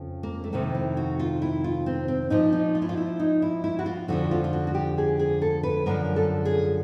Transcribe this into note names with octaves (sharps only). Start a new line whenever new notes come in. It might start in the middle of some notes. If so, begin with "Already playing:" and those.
Already playing: F2 C#3 F3
A#3
A3
F2 C3 D#3 A#3
E4
F#4
F4
E4
F4
C4
C4
A#2 F3 D#4
D#4
F4
E4
F4
E4
D#4
E4
E4
F#4
F4
F2 D3 F3 F#4
F4
F4
F#4
F#4
G4
G#4
G#4
A4
B4
F#2 D3 F3 A#4
A4
G#4